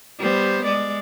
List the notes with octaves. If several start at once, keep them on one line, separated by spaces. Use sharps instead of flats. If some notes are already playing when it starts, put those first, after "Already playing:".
G3 B3 C5
G#3 D5